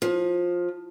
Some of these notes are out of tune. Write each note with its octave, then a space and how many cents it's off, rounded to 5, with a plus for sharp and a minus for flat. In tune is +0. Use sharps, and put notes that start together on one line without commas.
F3 +15